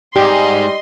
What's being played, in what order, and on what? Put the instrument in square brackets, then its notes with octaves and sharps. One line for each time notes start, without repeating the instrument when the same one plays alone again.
[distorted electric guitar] G#2 [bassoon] G3 [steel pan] G4 [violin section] D#5 C6